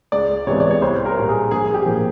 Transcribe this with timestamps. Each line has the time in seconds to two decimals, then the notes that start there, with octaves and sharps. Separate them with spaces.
0.12 C#2 D5
0.47 C3 E3 G#3 B3 C#5
0.60 D5
0.71 C#5
0.82 C2 C5
1.06 A#4
1.16 A#2 G3 A#3
1.29 G#4
1.51 A#1 G#4
1.74 G4
1.86 A#2 F3 A#3